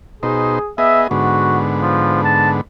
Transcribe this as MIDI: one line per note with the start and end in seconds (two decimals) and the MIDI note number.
0.23 0.59 47
0.23 0.59 63
0.23 0.71 68
0.23 0.59 72
0.78 1.07 59
0.78 1.07 68
0.78 1.07 75
0.78 1.04 76
1.11 2.61 44
1.11 2.61 50
1.11 2.61 59
1.11 1.60 66
1.82 2.22 53
2.24 2.51 81